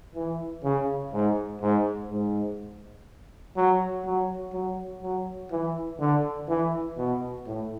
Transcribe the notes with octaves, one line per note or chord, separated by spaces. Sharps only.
E3
C#3
G#2
G#2
G#2
F#3
F#3
F#3
F#3
E3
D3
E3
B2
A2